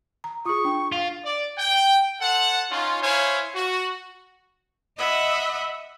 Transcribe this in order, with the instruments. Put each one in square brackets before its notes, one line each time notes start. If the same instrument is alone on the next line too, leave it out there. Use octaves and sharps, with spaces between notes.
[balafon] A#5
[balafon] F4 G#4 [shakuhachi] C#6 [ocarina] D#6
[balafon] D4 [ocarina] G5
[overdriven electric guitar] F4
[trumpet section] D5
G5
A4 C5 F#5
C#4 D#4 F4
E4 C5 C#5 F5 G#5
F#4
[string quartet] D#5 E5 F#5 B5